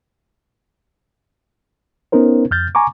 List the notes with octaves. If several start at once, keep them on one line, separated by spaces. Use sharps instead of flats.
B3 C#4 D#4 A#4 C5
F2 F6 G6 A6
G#5 A#5 C#6 D6